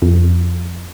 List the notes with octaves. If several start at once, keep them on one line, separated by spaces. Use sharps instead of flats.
F2